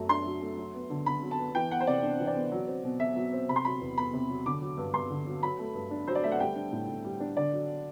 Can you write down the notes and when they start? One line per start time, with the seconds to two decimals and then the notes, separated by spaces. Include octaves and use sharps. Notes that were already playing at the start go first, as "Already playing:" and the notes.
Already playing: F#2 F#3 A3
0.09 D4 C6
0.26 F#3
0.41 A3
0.57 F#3
0.75 B3
0.90 D3
1.06 D3 B5
1.22 F#3
1.31 A5
1.39 B3
1.55 E3 G5
1.71 B3 F#5
1.81 C5
1.87 C3 D5
2.03 D4
2.20 E3
2.27 D5
2.35 B3
2.52 F#3
2.68 C4
2.84 B2
3.00 B2 E5
3.16 F#3
3.33 C4
3.49 C3 B5
3.56 C6
3.65 F#3 B5
3.81 E2
3.97 B3 B5
4.14 C3
4.29 F#3
4.46 D3 D6
4.61 F#3
4.78 G2
4.94 G2 C6
5.10 D3
5.26 F#3
5.43 F#3 B5
5.59 A3
5.75 G2
5.91 D4
6.07 F#3 C5
6.15 D5
6.24 A3 E5
6.32 F#5
6.40 G3 G5
6.55 D4
6.73 A2
6.88 A2
7.04 G3
7.20 D4
7.37 D3 D5
7.52 F#3